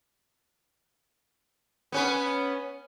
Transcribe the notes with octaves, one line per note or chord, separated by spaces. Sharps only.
B3 C#4 B4